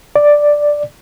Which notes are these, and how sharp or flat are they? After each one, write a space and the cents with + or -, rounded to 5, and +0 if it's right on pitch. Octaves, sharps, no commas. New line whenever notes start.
D5 +5